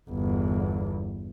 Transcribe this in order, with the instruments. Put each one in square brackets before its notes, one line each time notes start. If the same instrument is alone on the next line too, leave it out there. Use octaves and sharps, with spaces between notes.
[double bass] G1 E2